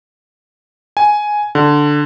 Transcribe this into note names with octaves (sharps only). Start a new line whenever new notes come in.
G#5
D3